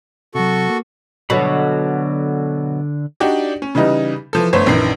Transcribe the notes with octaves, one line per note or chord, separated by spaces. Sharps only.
C3 F#3 F#4 A4 C#6
A#3
B2 D3 F#3 A4 B5
D4 D#4 F#4 G4 D5
C#4
C#3 E3 G3 D#4
E3 F3 A4
G1 A3 B3 C5 C#5
A#1 F#2 D#3 E3 C7